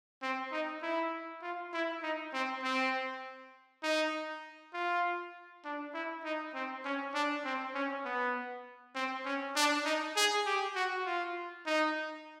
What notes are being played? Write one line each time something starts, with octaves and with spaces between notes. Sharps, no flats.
C4
D#4
E4
F4
E4
D#4
C4
C4
D#4
F4
D4
E4
D#4
C4
C#4
D4
C4
C#4
B3
C4
C#4
D4
D#4
G#4
G4
F#4
F4
D#4